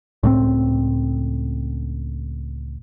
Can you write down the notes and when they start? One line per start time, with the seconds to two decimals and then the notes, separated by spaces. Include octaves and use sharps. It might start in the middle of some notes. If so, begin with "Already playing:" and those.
0.23 C#2 A2 F#3 C4